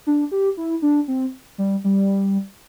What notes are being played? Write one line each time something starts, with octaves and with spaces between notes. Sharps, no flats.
D4
G4
E4
D4
C4
G3
G3